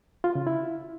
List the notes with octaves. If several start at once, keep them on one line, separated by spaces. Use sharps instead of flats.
F4
C#3
E4